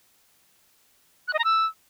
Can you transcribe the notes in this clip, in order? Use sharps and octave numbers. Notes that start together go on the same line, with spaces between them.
F#6
D#5
A#5
E6